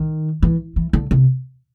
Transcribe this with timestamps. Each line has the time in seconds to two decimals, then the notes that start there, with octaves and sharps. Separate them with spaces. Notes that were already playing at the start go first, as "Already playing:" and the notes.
Already playing: D#3
0.43 E3
0.76 E3
0.93 D3
1.11 C3